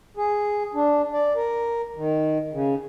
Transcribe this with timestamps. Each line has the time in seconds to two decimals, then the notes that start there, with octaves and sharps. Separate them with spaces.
0.17 G#4
0.74 D4
1.14 D5
1.36 A#4
1.96 D#3
2.53 C#3